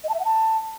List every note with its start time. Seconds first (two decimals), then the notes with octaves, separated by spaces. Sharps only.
0.04 D#5
0.09 A5
0.14 E5
0.20 F#5
0.25 A5